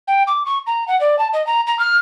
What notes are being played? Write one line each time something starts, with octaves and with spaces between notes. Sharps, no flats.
G5
D6
C#6
A#5
F#5
D5
A5
D#5
A#5
A#5
F6